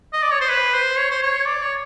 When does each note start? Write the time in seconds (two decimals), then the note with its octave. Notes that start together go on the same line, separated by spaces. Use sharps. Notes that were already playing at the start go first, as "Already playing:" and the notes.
0.13 D#5
0.23 D5
0.31 C#5
0.41 C5
0.50 B4
0.74 C5
0.98 C#5
1.11 C5
1.22 C#5
1.46 D5
1.62 C#5